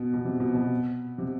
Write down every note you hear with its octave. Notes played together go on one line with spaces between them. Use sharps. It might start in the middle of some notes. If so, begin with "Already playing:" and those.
Already playing: B2
B2
C3
B2
B2
C3